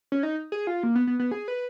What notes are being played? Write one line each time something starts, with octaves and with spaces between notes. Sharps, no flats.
C#4
D#4
G#4
F4
A#3
B3
B3
B3
G#4
B4